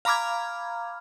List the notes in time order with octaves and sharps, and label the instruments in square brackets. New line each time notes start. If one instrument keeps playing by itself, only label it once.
[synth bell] F5 A#5 B5 D6 F6 G#6